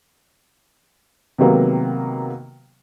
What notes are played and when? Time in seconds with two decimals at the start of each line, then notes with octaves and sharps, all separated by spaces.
1.38 C3 D#3 F#3 G#3 A#3 B3